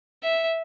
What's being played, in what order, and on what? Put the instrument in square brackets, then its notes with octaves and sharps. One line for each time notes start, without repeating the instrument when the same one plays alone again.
[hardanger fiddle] E5